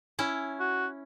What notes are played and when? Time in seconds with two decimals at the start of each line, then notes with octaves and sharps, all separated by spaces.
0.19 C#4 E4
0.60 F#4